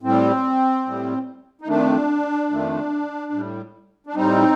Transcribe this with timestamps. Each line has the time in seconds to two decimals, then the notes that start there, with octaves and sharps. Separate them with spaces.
0.03 A2 G3 C4
0.86 A2 G3
1.61 D#4
1.67 F2 D#3 A3 D4
2.50 F2 D#3 A3
3.32 A2 G3
4.07 D4
4.15 A2 G3 C4 D#4